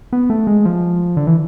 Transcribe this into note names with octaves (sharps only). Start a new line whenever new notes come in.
B3
A3
G#3
F3
D3
E3